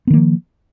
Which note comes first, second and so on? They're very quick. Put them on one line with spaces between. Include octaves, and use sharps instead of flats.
B3 D#3 A#3 F3